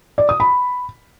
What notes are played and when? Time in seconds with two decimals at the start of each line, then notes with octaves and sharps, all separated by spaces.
0.18 D5
0.29 D#6
0.40 B5